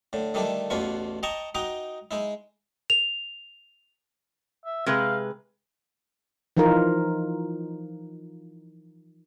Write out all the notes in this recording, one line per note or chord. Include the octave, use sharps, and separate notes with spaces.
A2 D3
D3 D#3 G3 A3 D4 E4
A1 E2 B2 F4 B4 C#6
D#5 G5 A5 A#5 C#6 D6
D#4 F#4 D#5 G5 A#5 D6
G#3 D#4 E4
F7
E5
C3 G#3 B4 F5
E3 F3 D#4 F4 A#4